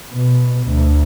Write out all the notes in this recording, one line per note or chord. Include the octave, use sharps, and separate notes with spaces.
B2
D2